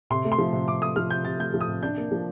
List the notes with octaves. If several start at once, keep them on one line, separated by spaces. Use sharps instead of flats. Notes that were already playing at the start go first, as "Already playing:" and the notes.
C3 C6
A3
C6
F3
C3
C3 D6
A3 D#6
F3 F6
C3 G6
C3 A6
A3 G6
F3
D#6
C3
D4 G6
A#3
F3